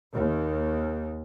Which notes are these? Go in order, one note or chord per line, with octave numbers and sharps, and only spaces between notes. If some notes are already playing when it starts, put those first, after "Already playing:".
D#2